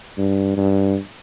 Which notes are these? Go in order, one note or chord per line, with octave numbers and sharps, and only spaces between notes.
G2
G2